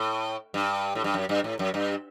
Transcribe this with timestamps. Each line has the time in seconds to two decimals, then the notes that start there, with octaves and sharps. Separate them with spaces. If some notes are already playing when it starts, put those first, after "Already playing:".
Already playing: A2
0.54 G2
0.95 A2
1.04 G2
1.14 F#2
1.29 G2
1.44 A2
1.59 F#2
1.74 G2